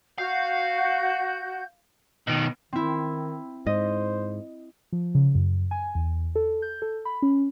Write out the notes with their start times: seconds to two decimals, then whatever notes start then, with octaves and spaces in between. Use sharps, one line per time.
0.18 F#4 F5 G6
2.27 B2 D#3
2.73 D#3 C4 E4
3.67 G#2 C5 D#5
4.92 F3
5.15 C#3
5.35 F#2
5.71 G#5
5.95 E2
6.35 A4
6.62 G6
6.82 A4
7.05 B5
7.22 C#4